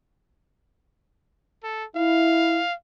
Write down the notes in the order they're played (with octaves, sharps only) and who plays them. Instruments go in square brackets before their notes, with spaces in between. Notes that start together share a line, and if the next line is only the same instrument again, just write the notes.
[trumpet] A4
[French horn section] E4 [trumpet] F5